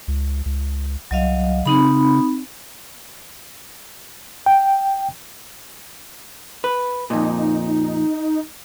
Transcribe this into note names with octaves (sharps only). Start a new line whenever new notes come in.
C#2
C#2
C2 F#3 D#5 F5
C#3 C4 D#4 B5
G5
B4
F2 A#2 D#4